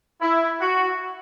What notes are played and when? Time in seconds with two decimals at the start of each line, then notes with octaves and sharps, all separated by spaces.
0.21 E4
0.60 F#4